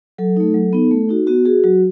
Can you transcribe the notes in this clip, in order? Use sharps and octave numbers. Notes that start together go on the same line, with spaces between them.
F#3 A4
A3 D#4
F#3
B3 D#4
A3
D#4 F#4
B3 F#4
F#4 G#4
F#3 F#4